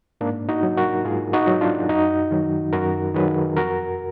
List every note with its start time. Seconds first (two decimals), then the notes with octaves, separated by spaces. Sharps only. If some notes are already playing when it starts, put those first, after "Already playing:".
0.21 G#2 A#3 D4
0.49 D#4 F#4
0.63 F#3
0.77 F#4 A#4
1.05 G#2 F4 G#4
1.33 D#4 F#4
1.47 F#3
1.61 D4 F4
1.89 F#2 D#4 F#4
2.31 D#3 F#3
2.73 F#2 F#4 A#4
3.15 D#3 F#3 G#4 B4
3.57 F2 F#4 A#4